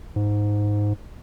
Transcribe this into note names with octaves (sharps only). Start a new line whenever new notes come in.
G#2